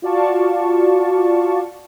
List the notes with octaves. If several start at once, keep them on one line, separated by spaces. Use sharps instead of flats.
F4 F#4 D5 F5 A5 C#6